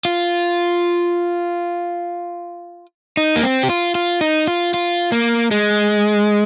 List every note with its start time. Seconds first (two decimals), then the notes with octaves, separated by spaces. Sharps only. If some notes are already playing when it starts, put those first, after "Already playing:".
0.05 F4
3.17 D#4
3.36 A#3
3.43 C4
3.63 G4
3.70 F4
3.95 F4
4.21 D#4
4.48 F4
4.74 F4
5.12 A#3
5.51 G#3